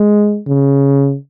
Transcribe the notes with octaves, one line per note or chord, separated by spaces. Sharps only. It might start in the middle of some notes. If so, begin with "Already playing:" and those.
Already playing: G#3
C#3